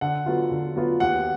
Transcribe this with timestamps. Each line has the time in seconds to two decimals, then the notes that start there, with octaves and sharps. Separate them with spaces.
0.01 D3 F#5
0.26 F#3 B3 F4
0.51 D3
0.76 F#3 B3 F4
1.00 D#2 F#5